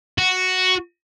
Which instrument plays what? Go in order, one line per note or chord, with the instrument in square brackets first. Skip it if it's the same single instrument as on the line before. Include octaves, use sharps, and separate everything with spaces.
[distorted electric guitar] F#4